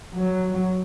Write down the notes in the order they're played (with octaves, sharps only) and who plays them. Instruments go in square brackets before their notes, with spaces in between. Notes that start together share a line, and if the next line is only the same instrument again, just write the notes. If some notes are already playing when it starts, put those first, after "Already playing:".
[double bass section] F#3